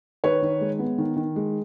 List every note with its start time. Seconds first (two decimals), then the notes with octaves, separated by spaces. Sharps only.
0.24 D#3 B4 C#5
0.42 D#3
0.61 G#3
0.79 B3
0.98 D#3
1.16 D#3
1.36 G#3